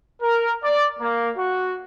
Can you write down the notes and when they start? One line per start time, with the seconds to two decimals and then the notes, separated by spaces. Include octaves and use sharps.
0.22 A#4
0.63 D5
1.00 A#3
1.37 F#4